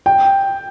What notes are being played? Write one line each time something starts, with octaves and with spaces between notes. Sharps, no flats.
G5